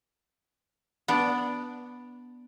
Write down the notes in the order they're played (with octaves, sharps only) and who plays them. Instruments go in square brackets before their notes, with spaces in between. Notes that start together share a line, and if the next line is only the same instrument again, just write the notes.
[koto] B3 D4 D5